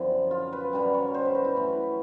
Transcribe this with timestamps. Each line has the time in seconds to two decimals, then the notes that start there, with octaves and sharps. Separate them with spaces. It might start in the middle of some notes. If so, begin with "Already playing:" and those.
Already playing: F#2 D3 F3 C4 E4
0.31 F4
0.53 B4
0.73 F#2 D3 G3
0.94 C#5
1.14 C5
1.25 B4
1.35 F#4
1.45 E4
1.55 E3 A3 C#4